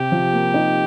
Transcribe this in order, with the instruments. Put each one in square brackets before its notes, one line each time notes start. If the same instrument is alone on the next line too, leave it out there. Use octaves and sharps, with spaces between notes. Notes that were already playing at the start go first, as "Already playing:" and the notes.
Already playing: [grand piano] C3 [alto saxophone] G4
[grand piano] F3
A#3
D#4